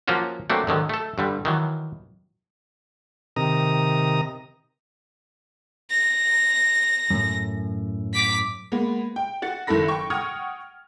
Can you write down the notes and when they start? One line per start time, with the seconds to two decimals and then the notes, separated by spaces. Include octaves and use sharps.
0.08 F3 F#3 A#3 C#4 F4 F#4
0.50 F#3 A3 A#3 C4 D4
0.67 G#2 D3 D#3 F#3
0.89 A3 A4
1.18 G2 D3 G3
1.45 D#3 E3 F#3
3.36 C3 D#3 A#5 D#6
5.91 A#6
7.10 F#2 A2
8.14 D6 B6
8.72 G#3 A#3 B3
9.16 G5
9.42 F#4 A6 C#7
9.67 F#1 D#3 E4 A4 B5 A#6
9.88 G5 C#6
10.10 F#5 G5 C#6 D#6 F6 G#6